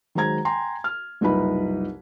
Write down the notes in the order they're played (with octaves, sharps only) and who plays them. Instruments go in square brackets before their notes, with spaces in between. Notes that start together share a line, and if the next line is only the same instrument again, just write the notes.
[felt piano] D#3 F#3 G#3 C5 A#5 G#6
G5 G#5 A#5 C6
F6
F#1 C2 D#4 F4 B4 B5